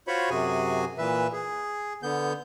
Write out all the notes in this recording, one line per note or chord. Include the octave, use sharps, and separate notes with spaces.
F4 F#4 C5 C#5 B5 C#6
F#2 C3 F#4 G#4 G#5
A#2 E3 B4 E5
G#4
D3 B3 G6